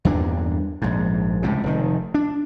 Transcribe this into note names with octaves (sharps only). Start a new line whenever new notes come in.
E2 G2 A#2 D4
A#1 G#2
C#2 A2 C3
F1 D#3
D4